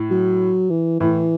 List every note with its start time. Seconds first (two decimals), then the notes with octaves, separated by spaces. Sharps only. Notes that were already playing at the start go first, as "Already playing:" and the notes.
Already playing: A2
0.11 F#3
0.70 E3
1.00 A2 E3